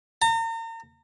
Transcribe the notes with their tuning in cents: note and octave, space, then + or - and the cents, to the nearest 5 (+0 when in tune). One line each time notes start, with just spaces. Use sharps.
A#5 -40